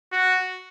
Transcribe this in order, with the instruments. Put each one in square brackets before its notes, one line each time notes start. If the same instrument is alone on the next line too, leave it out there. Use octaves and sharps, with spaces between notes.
[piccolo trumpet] F#4